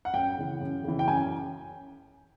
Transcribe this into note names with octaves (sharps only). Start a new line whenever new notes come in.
F#5
F#2 G5
C#3 E3
F#2
C#3 E3
G5
F#2 G#5